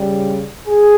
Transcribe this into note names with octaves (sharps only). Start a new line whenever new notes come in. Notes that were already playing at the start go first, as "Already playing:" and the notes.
Already playing: C#3 G3
G#4